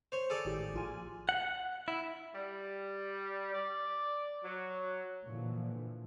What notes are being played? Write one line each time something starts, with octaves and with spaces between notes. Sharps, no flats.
C5 C#5
G#4 A4 D5
G#1 A2 G4
A#1 F4 G#5
F#5
E4
G3
D5
F#3
A#2 D3 E3 F3